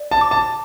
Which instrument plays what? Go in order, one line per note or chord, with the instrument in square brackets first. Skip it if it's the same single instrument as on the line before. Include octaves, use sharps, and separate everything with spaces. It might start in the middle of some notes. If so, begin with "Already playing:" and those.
Already playing: [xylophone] D5
[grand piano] A5
[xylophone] D6
[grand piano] A5